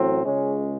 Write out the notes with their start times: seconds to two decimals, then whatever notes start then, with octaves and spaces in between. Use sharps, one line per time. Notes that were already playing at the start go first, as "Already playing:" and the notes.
Already playing: A1 A2 F#3 C4
0.25 C#2 C#3 G#3 C#4